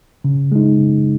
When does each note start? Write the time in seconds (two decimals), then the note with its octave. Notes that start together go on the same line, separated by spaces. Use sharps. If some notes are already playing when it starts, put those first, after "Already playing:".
0.24 C#3
0.52 G#3 D#4
0.78 C#3